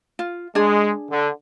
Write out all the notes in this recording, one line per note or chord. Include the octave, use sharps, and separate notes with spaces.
F4
G#3 D4 G#4
D3